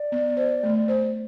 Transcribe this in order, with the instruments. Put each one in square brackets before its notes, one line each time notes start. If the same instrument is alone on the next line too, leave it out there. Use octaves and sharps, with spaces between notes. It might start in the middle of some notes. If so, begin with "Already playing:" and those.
Already playing: [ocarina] D5
[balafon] B3
C5
A3
C5